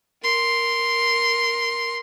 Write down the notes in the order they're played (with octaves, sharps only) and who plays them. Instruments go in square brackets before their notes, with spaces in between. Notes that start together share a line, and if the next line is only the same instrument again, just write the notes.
[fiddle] A#4 C6